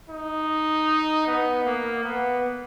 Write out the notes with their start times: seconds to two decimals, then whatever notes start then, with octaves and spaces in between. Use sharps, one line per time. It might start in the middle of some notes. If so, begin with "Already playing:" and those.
0.10 D#4
1.27 B3
1.65 A#3
2.04 B3